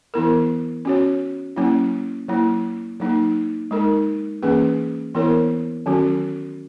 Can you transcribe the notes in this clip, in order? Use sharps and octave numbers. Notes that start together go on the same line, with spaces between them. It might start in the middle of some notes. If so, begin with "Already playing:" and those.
E3 B3 E4 A#4
C#4 F#4 C#5
F#3 A#3 C#4 E4
F#3 A#3 E4
F#3 A#3 D#4
G#3 D#4 A#4
E3 A#3 C#4 G#4 B4
E3 B3 E4 A#4 C#5
D#3 F#3 C#4 F#4